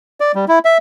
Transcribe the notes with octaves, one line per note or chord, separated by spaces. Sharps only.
D5
G3
E4
E5